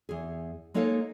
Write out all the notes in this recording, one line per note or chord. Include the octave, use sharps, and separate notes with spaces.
E2 G#4
G#3 A#3 D#4 A4 C#5 F5